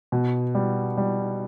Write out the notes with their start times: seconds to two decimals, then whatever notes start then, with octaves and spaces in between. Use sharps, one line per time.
0.12 B2
0.55 G3
0.98 G3